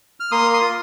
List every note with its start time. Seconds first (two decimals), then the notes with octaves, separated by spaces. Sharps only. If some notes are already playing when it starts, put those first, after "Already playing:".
0.20 F6
0.31 A#3 C6 D#6
0.53 C6 D#6
0.61 F4